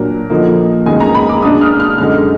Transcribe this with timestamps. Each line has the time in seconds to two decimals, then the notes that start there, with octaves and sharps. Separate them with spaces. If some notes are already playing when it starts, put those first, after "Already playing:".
Already playing: A#2 F#3 D4 A#4
0.30 D3 F3 A#3 D#4
0.86 F#2 D#3 G#3 B3 D#4 G#5
1.00 A#5
1.15 B5
1.29 D6
1.42 B2 G#3 D4 D#6
1.61 F6
1.80 F6
1.98 F#2 D3 G#3 D#4 F6